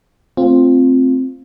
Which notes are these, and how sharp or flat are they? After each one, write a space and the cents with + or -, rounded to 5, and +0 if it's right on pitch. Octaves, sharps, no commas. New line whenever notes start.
A3 +0 C4 +0 F4 +0